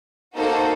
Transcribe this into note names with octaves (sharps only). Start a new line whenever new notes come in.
A#3 D#4 F#4 A4 C5